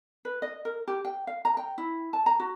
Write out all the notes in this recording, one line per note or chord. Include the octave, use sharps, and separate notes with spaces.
B4
D#5
A#4
G4
G5
F5
A#5
G5
E4
A5
A#5
F#4